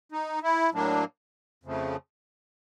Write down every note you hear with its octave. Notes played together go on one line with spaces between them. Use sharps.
D#4
E4
A2 F#3 A#3 D4
F2 C#3 F3 A3